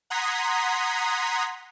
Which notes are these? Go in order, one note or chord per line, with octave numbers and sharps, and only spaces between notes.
F#5 A#5 C6 D#6 G#6 B6